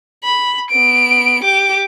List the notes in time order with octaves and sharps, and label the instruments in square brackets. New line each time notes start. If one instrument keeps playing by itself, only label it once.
[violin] B5
B3 D7
G4 D6